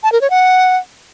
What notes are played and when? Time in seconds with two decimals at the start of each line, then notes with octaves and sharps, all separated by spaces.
0.03 A5
0.12 A#4
0.21 C#5
0.30 F#5